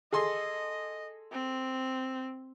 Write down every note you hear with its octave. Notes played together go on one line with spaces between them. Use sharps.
G#4 A4 D#5 C6
C4